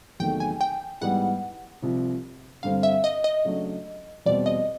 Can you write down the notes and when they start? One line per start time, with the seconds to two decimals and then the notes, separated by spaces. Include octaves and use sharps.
0.20 E2 C3 D#3 F#3 A3 G5
0.40 G#5
0.61 G5
1.01 G#2 E3 G3 B3 F#5
1.82 C2 C3 F3
2.63 G2 D3 G3 C4 F5
2.83 E5
3.04 D#5
3.24 D#5
3.45 C#3 F#3 A3 D4
4.26 E2 B2 G3 C4 D5
4.46 D#5